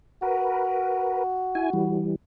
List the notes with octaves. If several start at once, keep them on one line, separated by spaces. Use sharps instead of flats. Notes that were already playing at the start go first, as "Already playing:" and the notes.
F#4 A#4 B4
E4 G#5
E3 G3